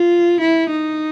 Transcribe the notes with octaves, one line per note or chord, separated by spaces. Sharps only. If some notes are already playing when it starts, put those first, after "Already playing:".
Already playing: F4
E4
D#4